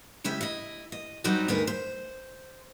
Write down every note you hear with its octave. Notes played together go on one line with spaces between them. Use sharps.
C#3 G#3 E4 G4 E5
E4 D#5
D#5
F#3 G3 C4 D#4 F#4 D5
D2 G2 D#4 G#4 A#4 B4
C5